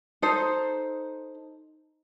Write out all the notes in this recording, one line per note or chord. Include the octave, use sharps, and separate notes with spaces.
D#4 A4 C5